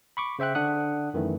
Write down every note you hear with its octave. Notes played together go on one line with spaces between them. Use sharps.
B5 C#6 D6
C#3 C5 E5 G5 F#6
D3 D4 F#5 D#6 F#6
F#2 D#3 E3 A3